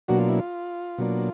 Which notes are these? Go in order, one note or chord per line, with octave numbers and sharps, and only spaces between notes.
B2 F#3 A#3 D4 F#4
F4
E4
F4
B2 F#3 A#3 D4